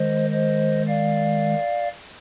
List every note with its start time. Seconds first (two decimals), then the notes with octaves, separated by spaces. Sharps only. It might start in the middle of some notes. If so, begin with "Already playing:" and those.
Already playing: D#3 G#3 C5 D#5
0.32 C5 D#5
0.87 D5 F5